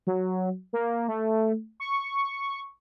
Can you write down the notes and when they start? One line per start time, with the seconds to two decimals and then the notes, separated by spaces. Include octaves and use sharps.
0.07 F#3
0.73 A#3
1.08 A3
1.80 C#6